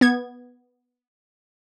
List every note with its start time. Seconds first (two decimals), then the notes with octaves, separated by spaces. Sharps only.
0.01 B3 G#6